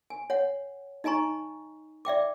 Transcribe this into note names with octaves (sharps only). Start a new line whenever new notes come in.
G#5
C#5 F#5
D#4 D#5 G#5 A#5 C#6
D5 E5 G5 D6